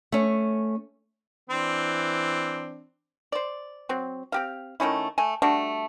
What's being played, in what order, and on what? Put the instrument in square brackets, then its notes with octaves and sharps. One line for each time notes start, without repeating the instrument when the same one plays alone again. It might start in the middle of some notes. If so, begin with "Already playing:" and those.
[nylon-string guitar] A3 C#4
[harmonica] E3 C4 D4
[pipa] C5 D5
F#3 C4
C4 G4 F5
D#3 A3 C#4 E4
A3 G#5
G3 A3 D4 F#4